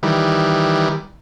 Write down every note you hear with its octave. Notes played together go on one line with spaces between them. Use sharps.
D#3 E3 G3